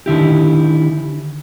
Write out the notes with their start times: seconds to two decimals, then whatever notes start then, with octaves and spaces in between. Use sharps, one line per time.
0.06 D3 D#3 E4 G4